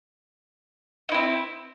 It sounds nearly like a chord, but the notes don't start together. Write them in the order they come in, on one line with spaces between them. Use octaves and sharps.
D#4 E4 C4